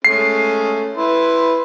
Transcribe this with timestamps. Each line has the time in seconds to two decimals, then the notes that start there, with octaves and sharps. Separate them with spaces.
0.05 G#3 A3 C#4 C7
0.96 E4 B4 C6